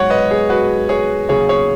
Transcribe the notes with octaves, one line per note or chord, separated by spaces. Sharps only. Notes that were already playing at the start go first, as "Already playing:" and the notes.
Already playing: G#2 F#3 C#5 F#5
B4 D#5
G#4
F#4 B4
G#4 C#5
D#2 C#3 F#3 G#4 C#5
G#4 C#5